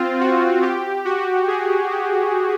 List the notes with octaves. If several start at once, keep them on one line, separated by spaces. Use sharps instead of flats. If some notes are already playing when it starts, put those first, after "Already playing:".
Already playing: C4 F4
F#4
G4
F#4
G#4
G4